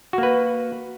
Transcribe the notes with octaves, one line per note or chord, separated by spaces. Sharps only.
A#3 F#4 B4